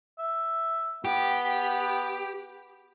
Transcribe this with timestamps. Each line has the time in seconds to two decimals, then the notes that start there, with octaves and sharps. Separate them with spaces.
0.19 E5
1.05 B3 G4